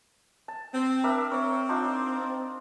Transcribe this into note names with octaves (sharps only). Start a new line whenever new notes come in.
A5
C4
D4 A#4 E5
C4 C#5
D4 D#4 F4